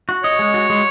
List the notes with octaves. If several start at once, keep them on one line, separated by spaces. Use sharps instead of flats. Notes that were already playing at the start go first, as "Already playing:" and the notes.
F#4
C#5 D#5
G#3
F#4
G#3